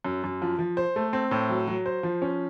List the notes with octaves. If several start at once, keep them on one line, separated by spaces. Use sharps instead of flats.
F#2
F#2
F3
F3
C5
A3
C4
A2
F#3
F#3
C5
F3
C#4